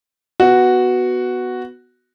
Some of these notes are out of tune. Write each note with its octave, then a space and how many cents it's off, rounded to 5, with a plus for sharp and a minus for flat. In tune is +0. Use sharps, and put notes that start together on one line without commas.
B3 +5 F#4 +0